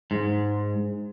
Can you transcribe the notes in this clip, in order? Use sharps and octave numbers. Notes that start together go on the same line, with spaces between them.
G#2